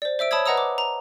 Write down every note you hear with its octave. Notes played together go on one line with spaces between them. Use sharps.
C5 D5
C5 E5 E6 D7
C#5 A5 B5 D#6 E6 G#6
B4 D#5 F#5 A#5 D#6 E6
D6
A#5